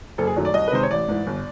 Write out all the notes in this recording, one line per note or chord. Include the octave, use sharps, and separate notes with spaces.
F#1 A4
G#4
F#2 D#3 F#3 A3
D5
C2 D#5
B4
C3 D#3 G#3 C5
C#5
A1 D5
G#2 E3
G1